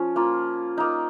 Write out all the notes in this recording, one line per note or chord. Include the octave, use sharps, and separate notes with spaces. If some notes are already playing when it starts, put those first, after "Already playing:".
Already playing: F3 C#4
A#3 F4
A#3 D#4